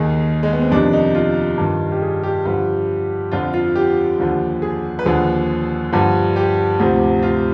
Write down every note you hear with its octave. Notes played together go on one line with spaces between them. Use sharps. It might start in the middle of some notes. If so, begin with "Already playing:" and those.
Already playing: D#2 D#3 G#4
G#3
B3
C4
F2 C3 D#3 D4
D#4
F4
G2 D#3
G4
G#4
G4
G2 D3 F3
F2 D3 F3 F4
F4
G4
D#2 D3 F3
G#4
B4
D#2 D3 F3 G#4
G2 D3 F3
G4
D2 C3 F3
F4